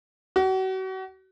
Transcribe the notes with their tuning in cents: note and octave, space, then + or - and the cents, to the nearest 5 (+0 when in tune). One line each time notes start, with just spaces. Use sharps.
F#4 +35